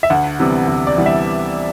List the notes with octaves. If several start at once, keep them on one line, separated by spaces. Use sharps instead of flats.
E5
D2 F#5
C3 E3 G3 B3
D2
D5
C3 E3 G3 B3
E5